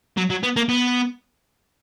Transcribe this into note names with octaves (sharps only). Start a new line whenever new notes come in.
F#3
F#3
B3
A#3
B3